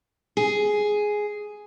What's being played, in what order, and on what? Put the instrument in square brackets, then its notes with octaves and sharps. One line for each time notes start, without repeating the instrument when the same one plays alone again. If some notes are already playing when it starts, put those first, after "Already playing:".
[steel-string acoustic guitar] G#4